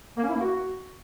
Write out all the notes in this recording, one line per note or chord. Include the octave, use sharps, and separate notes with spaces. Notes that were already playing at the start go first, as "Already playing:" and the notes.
A#3
C#4
E4
A#3
F#4